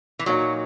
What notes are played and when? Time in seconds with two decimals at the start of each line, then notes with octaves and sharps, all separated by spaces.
0.19 E3
0.26 A#2 F#3 A#3 D#4 F#4 C#5